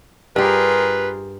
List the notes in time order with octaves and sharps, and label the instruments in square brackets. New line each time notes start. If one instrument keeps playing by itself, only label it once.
[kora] G2 G4 [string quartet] F4 G#4 A#4 [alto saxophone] B4